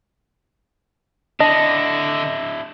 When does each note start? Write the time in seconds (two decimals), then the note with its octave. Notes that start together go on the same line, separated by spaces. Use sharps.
1.40 D3 D4 E4 D#5 A5